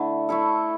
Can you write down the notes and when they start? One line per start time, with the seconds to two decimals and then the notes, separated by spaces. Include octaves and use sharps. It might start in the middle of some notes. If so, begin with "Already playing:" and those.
Already playing: D3 A3 E4 A4
0.29 A3 E4 A4